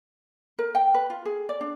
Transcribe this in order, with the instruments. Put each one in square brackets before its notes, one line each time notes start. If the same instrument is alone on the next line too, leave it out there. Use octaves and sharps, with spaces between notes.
[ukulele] A#4
G5
B4
F4
G#4
D5
D4